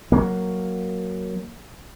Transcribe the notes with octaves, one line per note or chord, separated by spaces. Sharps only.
F#3 A#3